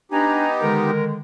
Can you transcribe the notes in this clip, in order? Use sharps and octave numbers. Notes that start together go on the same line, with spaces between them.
B3 D4 D#4 G4 G#5 A#5
D3 D#3 G#3 A#4